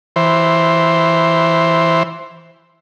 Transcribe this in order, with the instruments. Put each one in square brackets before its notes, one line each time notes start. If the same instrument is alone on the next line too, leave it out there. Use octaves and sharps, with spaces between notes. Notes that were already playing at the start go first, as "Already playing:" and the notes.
[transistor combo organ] E3 C5